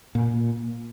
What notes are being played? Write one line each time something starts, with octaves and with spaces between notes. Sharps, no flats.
A#2